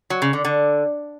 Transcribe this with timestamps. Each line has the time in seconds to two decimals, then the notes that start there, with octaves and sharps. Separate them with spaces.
0.10 F#3
0.22 C#3
0.33 D3
0.45 D3